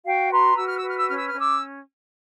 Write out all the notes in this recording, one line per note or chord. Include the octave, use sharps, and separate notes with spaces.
F#4 F5 G5
B4 A#5 C6
F#4 E6
F6
E6
B4 F6
E6
C#4 F6
E6
F6
C#4 D6 E6